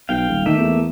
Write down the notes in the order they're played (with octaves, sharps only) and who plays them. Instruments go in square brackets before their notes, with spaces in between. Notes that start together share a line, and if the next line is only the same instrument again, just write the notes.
[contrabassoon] B1 [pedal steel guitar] F5 G5
[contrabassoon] D#1
[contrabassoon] D#3 [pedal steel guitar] A3 A#3 E5
[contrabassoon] E2